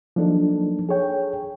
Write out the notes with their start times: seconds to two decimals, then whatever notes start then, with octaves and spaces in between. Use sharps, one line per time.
0.16 F3 F#3 A#3 D4 D#4 A4
0.89 G#4 A4 C#5 G5